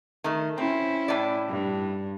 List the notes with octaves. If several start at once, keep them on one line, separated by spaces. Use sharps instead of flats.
D#3 A3
C4 C#4 E4
A2 D5
G2